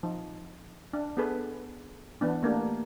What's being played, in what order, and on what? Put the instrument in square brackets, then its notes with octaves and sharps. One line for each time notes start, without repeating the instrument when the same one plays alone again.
[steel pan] F3 D#4
D4
B3 D4 G#4 A4 B4
E3 B3 D4
A3 A#3 D4 G4